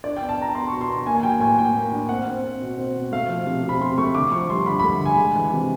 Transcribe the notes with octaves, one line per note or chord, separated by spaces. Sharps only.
D4 D5
B3 G5
A5
B3 A#5
B3 C6
B2 C#6
C6
B3
A#3 G#5
G#5
F#3 G5
A2 G#5
A#3 G5
A#3
D4
C4 F#5
C4
C4
B2
C4
B2
A3 F5
F3
C3
C3
B5
C3 C6
A3 C#6
D3 D6
F3 C#6
G2 C6
D3 B5
A3 B5
D3 G#5
G#3
E3
C3